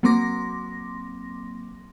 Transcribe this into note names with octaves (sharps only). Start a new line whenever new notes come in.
F#3 A#3 C4 C6 D6 A#6